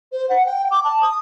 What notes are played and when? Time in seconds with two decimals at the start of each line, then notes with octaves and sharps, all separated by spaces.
0.11 C5
0.29 F#5
0.45 G5
0.70 D6
0.83 A5
1.01 D#6